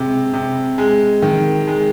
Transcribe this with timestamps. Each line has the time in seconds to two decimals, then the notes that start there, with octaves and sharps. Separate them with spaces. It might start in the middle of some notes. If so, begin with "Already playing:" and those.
Already playing: C3 G#3
0.34 C3
0.78 G#3
1.22 D#3
1.67 G#3